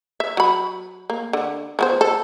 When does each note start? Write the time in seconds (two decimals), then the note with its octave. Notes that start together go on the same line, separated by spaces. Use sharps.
0.20 E5
0.37 F#3 B5
1.10 A#3
1.33 D3
1.79 F3 B3 C5
2.01 A4